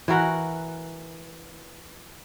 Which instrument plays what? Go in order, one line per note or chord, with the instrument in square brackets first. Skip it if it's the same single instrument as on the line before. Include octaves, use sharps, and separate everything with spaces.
[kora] E3 F#4 A#4 F#5